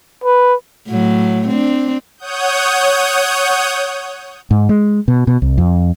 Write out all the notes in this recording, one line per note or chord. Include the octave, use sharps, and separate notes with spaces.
B4
A2 F#3
C4 D4
C#5 F#5 D#6 G6
G#2
G#3
B2
B2
C2
F2